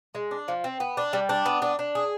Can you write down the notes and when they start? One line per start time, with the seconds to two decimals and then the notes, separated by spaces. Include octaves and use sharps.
0.15 G#3
0.31 D4
0.48 F3
0.64 C4
0.80 B3
0.97 D4
1.13 G3
1.29 D4
1.46 B3
1.62 D4
1.79 D4
1.95 G#4